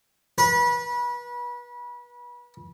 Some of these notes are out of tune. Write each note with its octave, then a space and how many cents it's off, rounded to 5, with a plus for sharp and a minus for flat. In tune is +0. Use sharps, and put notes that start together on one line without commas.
B4 -30